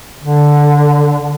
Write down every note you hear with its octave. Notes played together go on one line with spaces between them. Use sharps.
D3